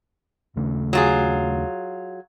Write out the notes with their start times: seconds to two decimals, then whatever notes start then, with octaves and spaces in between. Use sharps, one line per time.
0.56 D#2 C#3 A3
0.93 F#3 F4 G#4